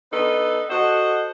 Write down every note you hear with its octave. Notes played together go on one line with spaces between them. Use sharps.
B3 D4 D#4 A4 B4
F#4 A4 C5 D#5 F#5